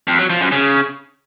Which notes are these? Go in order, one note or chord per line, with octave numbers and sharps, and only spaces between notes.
F2
F#3
F3
F#2
C#3